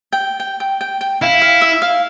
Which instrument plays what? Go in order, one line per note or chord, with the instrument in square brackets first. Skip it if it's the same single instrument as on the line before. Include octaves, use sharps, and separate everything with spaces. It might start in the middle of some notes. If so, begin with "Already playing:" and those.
[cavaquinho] G5
G5
G5
G5
G5
[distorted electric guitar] E4 [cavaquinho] F5
[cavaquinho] F5
E5
F5